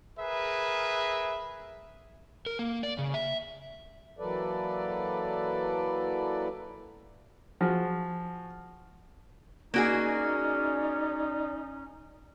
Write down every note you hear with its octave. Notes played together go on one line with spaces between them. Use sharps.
G#4 A#4 B4 E5
A#4
A#3
D5
C#3
E5
E3 F#3 A#3 A4 B4 D5
F3 F#4 G#4
A#3 C#4 D#4 F#4 G#4 D5